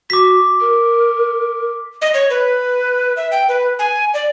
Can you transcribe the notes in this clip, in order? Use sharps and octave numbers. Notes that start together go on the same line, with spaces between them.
F#4 D6 B6
A#4
D#5
C#5
B4
E5
G5
B4
G#5
D5